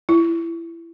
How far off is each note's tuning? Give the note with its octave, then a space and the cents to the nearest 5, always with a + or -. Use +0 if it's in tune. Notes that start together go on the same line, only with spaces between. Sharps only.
E4 +20